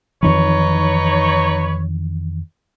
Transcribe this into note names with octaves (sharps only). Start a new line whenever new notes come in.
F2 D#3 E3 D#4 B4 C#5